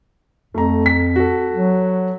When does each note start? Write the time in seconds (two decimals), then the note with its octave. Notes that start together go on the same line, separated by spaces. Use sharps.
0.54 F2 A3 A#5
0.86 B6
1.16 F#4 A4
1.53 F#3